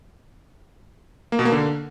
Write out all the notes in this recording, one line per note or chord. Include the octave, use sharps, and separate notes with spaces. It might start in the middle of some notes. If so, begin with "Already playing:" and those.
A#3
B2
A#3
D3